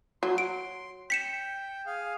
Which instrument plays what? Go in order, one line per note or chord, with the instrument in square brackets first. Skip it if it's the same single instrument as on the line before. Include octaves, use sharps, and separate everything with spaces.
[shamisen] F#3 [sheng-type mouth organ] C6
[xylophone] D7
[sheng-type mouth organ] G5 [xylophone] B6 C#7 E7
[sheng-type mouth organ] G#4 F5